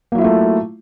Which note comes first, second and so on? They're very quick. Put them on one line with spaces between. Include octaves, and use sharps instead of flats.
A#3 F#3 E4 F4 A3